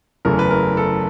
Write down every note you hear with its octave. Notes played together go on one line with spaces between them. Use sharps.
F#1 E2 C#3 E3 A3 A#4
B4
A#4
A4